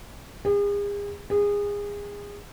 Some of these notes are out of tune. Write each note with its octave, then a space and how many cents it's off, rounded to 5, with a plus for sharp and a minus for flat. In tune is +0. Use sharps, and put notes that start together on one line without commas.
G#4 -40
G#4 -25